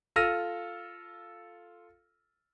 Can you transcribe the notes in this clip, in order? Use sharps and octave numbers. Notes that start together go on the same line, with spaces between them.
F4 A4 E6 F6 A#6 D#7